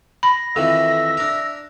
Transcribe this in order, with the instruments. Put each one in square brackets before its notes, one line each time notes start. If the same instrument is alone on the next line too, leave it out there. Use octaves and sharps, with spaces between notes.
[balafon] B5 [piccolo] A#6
[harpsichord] F2 D#3 E3 [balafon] A4 [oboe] E5
[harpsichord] D4 A#4